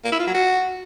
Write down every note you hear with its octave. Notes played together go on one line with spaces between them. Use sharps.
A#3
E4
F4
F#3
F#4